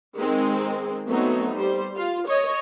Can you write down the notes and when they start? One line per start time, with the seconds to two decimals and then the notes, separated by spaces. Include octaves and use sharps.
0.17 D#3 G#3 C4
1.09 F#3 A3 B3 C4 D#4
1.55 G3 C5
1.97 F4
2.28 C#5 D#5